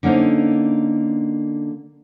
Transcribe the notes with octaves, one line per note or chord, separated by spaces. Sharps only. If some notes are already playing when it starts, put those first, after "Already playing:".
D3 A#3 C#4 D#4 C5